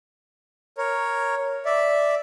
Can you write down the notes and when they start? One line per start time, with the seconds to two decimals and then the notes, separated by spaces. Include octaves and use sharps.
0.78 A#4 C#5
1.65 D5 E5